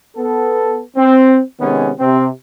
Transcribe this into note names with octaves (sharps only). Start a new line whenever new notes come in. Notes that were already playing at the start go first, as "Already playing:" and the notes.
B3 A4
C4
C3 D#3 G#3 B3 C#4
C3 C4